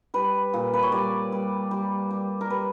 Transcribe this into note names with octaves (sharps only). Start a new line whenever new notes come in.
G3 B4
A#2
B4
C#5
G3 D5
G3
G3
G3
A#4
G3 B4